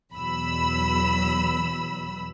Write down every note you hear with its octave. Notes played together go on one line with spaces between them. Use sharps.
E2 B2 F#3 B5 E6